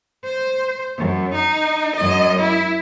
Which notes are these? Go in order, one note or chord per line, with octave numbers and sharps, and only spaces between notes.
C5
F#2
D#4
F#2 D#5
E4